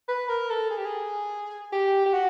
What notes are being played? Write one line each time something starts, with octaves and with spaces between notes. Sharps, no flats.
B4
A#4
A4
G#4
G4
G#4
G4
G4
F#4